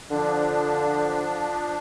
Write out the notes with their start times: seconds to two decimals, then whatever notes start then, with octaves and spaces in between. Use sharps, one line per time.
0.11 D3 F3 D4